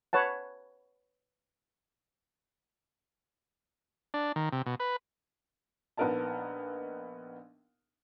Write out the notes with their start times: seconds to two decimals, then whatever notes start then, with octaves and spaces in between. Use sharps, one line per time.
0.13 B4 C#5 F#5 A5
4.14 D4
4.36 D#3
4.52 C3
4.66 B2
4.80 B4
5.97 A#1 B3 D#4 A#4 D#5 A5